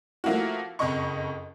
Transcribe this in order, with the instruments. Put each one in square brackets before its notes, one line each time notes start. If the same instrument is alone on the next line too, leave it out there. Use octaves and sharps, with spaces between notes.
[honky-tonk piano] F3 A3 A#3 E4 F#4
F#1 F2 D#5 C#6